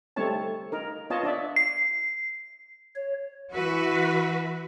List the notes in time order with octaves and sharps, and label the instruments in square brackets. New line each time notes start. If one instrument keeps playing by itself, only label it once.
[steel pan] G3 A3 C4 D#4 C#5 A5
D#4 A#4
B3 F4 C#5 D#5 A5
D4 D5 E5
[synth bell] C7
[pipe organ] C#5
[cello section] E3 F#4 B4 E5